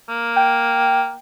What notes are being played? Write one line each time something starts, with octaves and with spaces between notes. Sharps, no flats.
A#3
G5